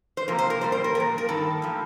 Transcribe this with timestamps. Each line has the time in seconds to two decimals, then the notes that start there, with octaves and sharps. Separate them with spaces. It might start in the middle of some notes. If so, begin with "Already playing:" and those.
0.17 C5
0.28 C3 F3 A#3 A#4
0.39 C5
0.50 A#4
0.61 A#2 G3 A#3 C5
0.72 C5
0.84 A#4
0.95 A#2 F3 A#3 A#4
1.18 A#4
1.29 G2 D#3 A4
1.62 A2 F3 A#3